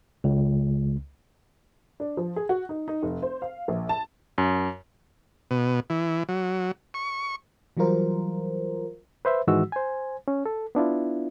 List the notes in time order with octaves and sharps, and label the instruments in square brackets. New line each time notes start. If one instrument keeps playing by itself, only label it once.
[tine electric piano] C#2
[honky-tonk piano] D4
F3
G#4
F#4
D#4
D#4
F1
C5
F5
A#1
A5
[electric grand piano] F#2
[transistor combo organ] B2
E3
F#3
C#6
[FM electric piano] E3 F#3 G3 F4 A#4 C5
[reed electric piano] B4 C5 E5
G#2 D#3 E3 G#3 F#4 E6
C5 G#5
C#4
A4
B3 D4 E4 F4